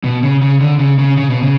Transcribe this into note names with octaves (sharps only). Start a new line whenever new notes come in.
B2
C#3
C#3
D3
C#3
C#3
C#3
B2
C#3